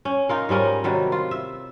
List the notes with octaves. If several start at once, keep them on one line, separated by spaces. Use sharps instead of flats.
C#4
D#4 F4 A#4
G#2 G3 C#4 A#4
C3 D#3 F#3 G3
F4
E5